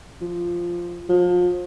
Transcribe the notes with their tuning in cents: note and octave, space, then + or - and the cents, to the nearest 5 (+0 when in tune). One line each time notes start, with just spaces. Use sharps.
F3 -5
F3 +30